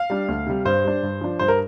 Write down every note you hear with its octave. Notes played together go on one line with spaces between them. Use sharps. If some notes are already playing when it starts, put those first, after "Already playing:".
Already playing: F5
G3 D4
D2
C3 G3
G2 C5
G3 D4
G2
F3 D4
G2 C5
A#4